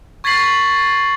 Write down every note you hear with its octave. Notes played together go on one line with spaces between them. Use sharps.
C#6 G#6 A6 B6 C7 F#7